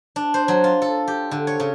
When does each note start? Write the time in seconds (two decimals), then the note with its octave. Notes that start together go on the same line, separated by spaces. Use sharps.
0.16 D4
0.34 C5
0.48 F#3
0.64 F4
0.82 A4
1.08 G4
1.31 D3
1.47 C#5
1.60 C#3